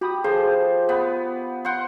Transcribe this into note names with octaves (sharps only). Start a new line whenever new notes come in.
F#4 G4 B5 D#6
F3 G#4 A4 C5
B3 B5
C5 F#5 C6